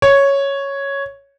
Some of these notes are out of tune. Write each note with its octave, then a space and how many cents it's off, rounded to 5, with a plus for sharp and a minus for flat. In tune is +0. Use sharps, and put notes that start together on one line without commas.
C#5 +0